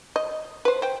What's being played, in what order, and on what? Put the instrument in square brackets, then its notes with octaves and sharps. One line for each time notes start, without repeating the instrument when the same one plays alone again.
[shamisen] D#5
B4 C5
C5 G5